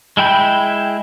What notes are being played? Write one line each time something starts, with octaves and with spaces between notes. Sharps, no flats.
G#3 E4 G5 B5 G6